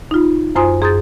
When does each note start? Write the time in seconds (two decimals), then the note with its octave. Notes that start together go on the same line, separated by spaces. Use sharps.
0.11 D#4 F4
0.56 F#2 F4 C5 G#5 C6 D#6
0.81 F#2 G#4 C6 D#6 G6 A6